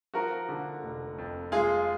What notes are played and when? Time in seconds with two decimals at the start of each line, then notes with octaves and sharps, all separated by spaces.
0.14 F3 F#4 A#4
0.49 D3
0.83 F1
1.18 F2
1.52 G#3 F4 G#4